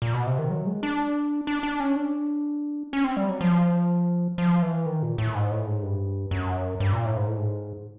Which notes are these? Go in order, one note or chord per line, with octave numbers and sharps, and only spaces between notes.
A#2
B2
C3
D#3
F#3
G#3
D4
D4
D4
C#4
D4
C#4
C4
G3
F#3
F3
F3
E3
D#3
A#2
A2
G#2
A2
G#2
G2
F#2
G2
A#2
A2
G#2
A2
G#2